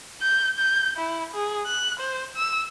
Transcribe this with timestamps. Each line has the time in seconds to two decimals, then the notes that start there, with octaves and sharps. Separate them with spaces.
0.22 G6
0.58 G6
0.97 E4
1.34 G#4
1.67 F#6
2.00 C5
2.36 E6